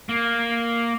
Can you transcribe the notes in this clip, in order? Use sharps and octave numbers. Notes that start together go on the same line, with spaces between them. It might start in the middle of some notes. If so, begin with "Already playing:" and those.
A#3